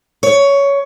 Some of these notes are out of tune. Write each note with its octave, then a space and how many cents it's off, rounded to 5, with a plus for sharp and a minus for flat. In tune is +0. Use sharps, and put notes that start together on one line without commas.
C#5 +15